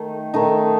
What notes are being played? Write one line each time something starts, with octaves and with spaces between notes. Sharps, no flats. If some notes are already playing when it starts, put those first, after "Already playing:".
Already playing: D#3 A3 D#4
D#3 A3 D#4